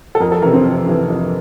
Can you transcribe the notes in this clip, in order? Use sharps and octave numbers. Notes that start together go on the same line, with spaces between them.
A4
F2 A#4
A4
C3 E3 A#4
C4
F2
C3 E3
F2